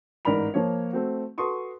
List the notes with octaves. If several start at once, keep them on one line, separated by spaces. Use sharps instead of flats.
A1 G#2 A#4 D5 B5 F7
F3 A#3 C#5
A3 C4 F#4
F#4 A4 B4 C6 C#6 D#6